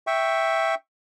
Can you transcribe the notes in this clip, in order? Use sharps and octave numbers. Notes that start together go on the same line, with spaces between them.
E5 G5 C#6